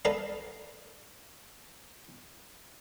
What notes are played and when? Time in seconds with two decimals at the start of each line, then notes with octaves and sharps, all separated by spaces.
0.05 A4 B4 D5 D#5 F5 A#5